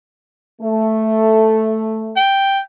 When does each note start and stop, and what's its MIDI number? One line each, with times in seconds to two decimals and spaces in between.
0.62 2.17 57
2.16 2.59 79